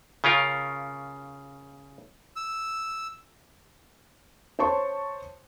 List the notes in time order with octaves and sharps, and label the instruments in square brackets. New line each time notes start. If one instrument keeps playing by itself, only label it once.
[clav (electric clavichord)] C#3 C#4 F4 A#4
[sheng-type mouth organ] E6
[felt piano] C5 C#5 A5 C6 C#6